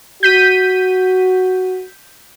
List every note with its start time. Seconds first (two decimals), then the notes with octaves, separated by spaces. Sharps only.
0.23 F#4 G6 B6 D#7